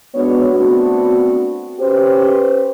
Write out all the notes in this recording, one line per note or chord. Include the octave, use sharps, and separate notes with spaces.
G#3 B3 D4 F#4 C#5
A3 B3 C4 D4 F#4
C#4 G4 B4 C5